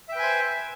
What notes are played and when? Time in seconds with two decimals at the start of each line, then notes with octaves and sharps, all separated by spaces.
0.09 E5
0.12 G5
0.16 B4
0.19 G#5
0.22 C5